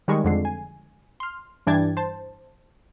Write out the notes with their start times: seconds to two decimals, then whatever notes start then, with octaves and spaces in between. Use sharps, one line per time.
0.08 D#3 G3 G#3 C#6
0.24 F2 D3 G#3 C7
0.45 G#5
1.20 C6 F6
1.67 G2 E3 D4 G5 G#6 A6
1.97 C5 A5